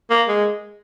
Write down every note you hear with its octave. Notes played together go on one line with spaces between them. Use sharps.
A#3
G#3